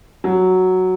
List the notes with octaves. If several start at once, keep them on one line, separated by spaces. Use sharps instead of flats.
F#3